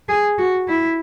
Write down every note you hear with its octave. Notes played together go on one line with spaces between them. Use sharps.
G#4
F#4
E4